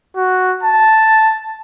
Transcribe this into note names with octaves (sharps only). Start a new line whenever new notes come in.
F#4
A5